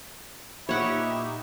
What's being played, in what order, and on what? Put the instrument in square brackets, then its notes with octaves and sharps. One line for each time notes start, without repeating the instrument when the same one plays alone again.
[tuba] A#2 [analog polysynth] D#4 G4 [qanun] C#5 F#5 C#6 [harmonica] E5 B5